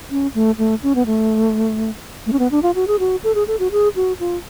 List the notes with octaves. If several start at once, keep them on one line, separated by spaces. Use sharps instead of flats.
C#4
A3
A3
C#4
B3
A3
A3
C#4
B3
D4
F4
F#4
G#4
F#4
A4
G#4
A4
F#4
G#4
F#4
F4